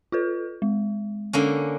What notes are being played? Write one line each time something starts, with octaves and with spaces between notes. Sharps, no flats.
F4 A4 B4
G#3
D3 A#3 C#4